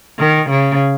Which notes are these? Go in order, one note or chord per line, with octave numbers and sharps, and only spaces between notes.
D#3
C#3